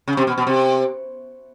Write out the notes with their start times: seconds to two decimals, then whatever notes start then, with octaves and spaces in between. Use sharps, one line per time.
0.08 C#3
0.17 C3
0.27 B2
0.38 B2
0.47 C3